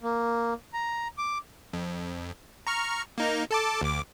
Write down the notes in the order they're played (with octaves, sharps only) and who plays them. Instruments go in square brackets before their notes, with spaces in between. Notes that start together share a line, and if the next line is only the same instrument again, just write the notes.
[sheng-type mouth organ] A#3
A#5
D6
[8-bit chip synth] F2
A#5 C#6 F6
A#3 D#4 A#5
A4 A5 D6
D2 D6